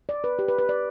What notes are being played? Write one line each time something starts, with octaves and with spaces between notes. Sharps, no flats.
D5
B4
G4
B4
B4
D5